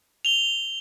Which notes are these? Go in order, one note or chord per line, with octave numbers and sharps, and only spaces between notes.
F7 G7